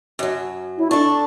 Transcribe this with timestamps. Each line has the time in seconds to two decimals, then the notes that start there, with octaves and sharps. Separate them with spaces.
0.19 F#2 F#3
0.78 E4
0.91 D4 A4 C#6